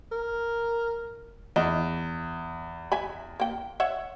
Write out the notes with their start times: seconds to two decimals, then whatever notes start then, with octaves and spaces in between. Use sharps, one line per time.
0.12 A#4
1.56 E2 D#5
2.92 E5 G#5 B5
3.40 A#3 G5
3.80 C#5 E5 F#5